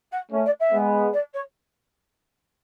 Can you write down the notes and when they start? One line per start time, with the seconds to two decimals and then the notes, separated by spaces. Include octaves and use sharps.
0.12 F#5
0.32 A3 C#4
0.45 D5
0.60 E5
0.72 G#3 B3
1.13 D5
1.33 C#5